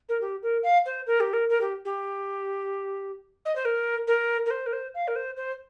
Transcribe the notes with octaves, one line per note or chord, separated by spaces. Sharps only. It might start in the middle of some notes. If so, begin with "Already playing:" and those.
A#4
G4
A#4
F5
C5
A#4
G4
A#4
A#4
G4
G4
D#5
C5
A#4
A#4
A#4
C5
A#4
C5
F5
A#4
C5
C5